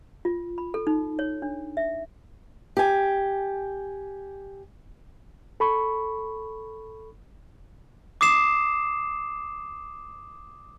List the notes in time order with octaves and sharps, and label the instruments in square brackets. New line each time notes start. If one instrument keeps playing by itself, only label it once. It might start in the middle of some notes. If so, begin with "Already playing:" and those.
[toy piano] F4
B5
A4
D#4
C#5
D4
E5
[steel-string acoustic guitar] G4 G#5
[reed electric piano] A4 B5 C#6
[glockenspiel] D6 D#6 C7 E7